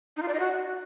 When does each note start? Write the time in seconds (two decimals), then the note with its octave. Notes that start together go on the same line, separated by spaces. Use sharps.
0.17 D#4
0.22 F4
0.28 D5
0.34 D#5
0.40 F#4